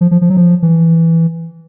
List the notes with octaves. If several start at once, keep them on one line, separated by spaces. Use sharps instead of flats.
F3
F3
F3
F#3
F3
E3